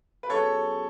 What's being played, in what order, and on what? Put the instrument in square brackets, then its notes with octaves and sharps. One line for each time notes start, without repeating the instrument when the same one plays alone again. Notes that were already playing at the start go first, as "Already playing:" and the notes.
[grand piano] B4
[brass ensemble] B2 F#3 C#4 G#4 [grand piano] A4 C#5